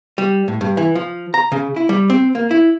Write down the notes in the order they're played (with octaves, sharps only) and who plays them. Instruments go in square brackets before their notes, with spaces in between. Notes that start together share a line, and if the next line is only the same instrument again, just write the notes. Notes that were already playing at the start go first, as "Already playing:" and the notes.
[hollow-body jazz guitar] G3
A2
G2
E3
F3
A#5
C#3
E4
G3
C4
A#3
E4